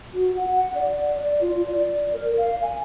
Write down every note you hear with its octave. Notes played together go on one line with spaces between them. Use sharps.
F#4
F#5
F#5
D5
D5
D5
F4
D5
A#4
F5
G#5